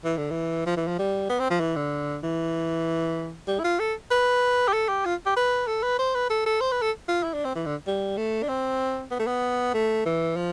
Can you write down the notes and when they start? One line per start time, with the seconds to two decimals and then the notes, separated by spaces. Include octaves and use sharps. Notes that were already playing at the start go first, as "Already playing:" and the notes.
0.05 E3
0.17 D3
0.30 E3
0.66 F3
0.77 E3
0.88 F3
0.98 G3
1.30 B3
1.39 C4
1.50 F3
1.60 E3
1.76 D3
2.23 E3
3.48 G3
3.59 E4
3.64 F4
3.80 A4
4.11 B4
4.68 G4
4.73 A4
4.89 G4
5.05 F4
5.26 G4
5.37 B4
5.67 A4
5.83 B4
5.99 C5
6.14 B4
6.30 A4
6.46 A4
6.61 C5
6.72 B4
6.82 A4
7.08 F4
7.24 E4
7.34 D4
7.45 C4
7.55 E3
7.66 D3
7.87 G3
8.17 A3
8.43 D4
8.49 C4
9.11 B3
9.19 A3
9.27 B3
9.74 A3
10.06 E3
10.36 F3